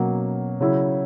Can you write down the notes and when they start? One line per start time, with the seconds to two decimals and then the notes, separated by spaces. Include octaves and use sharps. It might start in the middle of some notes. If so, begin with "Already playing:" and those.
Already playing: B2 F#3 A#3 C#4
0.60 C#3 F#3 C#4 E4